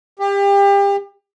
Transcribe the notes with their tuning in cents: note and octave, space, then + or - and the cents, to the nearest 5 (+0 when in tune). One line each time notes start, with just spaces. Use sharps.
G4 +30